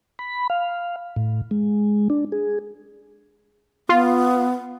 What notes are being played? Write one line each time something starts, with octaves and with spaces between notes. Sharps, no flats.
B5
F5
A2
G#3
D4
G#4
B3 F4